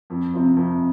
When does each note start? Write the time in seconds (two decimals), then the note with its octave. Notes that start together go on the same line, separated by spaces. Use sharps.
0.10 F2
0.34 C3 F3
0.56 F2